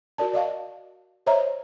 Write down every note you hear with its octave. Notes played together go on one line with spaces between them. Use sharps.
F#4 A#4 D5 A5
D5 D#5 F5 A5
C5 C#5 D#5 E5 A#5